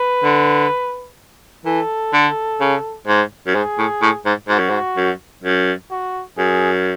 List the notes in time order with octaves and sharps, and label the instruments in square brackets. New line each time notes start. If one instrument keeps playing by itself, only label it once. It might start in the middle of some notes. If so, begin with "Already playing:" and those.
Already playing: [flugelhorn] B4
[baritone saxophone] D3
[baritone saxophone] E3 [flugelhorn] A4
[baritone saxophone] D3
C#3
G#2
F#2
[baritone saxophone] G#2 [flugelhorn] G#4
[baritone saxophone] A2
A2
G#2
[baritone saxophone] G#2 [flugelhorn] F#4
[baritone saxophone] F#2
G#2
F#2
F#2
[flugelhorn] F#4
[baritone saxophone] F#2 [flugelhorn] G#4